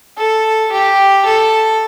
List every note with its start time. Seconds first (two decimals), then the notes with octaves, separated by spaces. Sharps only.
0.18 A4
0.72 G4
1.25 A4